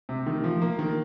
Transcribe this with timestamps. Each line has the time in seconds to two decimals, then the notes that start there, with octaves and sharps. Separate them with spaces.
0.09 C3
0.26 D#3
0.44 F3
0.62 A#3
0.79 D#3